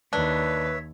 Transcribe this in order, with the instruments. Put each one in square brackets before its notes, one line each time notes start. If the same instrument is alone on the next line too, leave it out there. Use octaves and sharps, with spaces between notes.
[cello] D#2 [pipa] D4 [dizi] B4 [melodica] C#5 E5